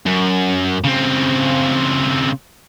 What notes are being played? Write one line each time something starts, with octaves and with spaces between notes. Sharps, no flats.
F#2
C#3 C4